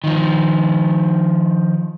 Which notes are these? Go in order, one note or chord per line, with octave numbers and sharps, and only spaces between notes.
D#3 F3